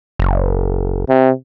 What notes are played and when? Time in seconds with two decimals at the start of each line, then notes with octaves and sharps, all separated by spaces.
0.19 F#1
1.09 C3